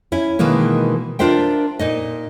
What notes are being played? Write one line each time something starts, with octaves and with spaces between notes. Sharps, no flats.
C#4 E4
B2 D#3 E3 G#3 A#3
D4 F4 A#4 C5 E5 G5
A#2 D#4 D#5